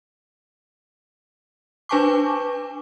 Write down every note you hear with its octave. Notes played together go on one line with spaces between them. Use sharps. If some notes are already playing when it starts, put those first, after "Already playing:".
D4 B4 G#5 A5 C#6 D6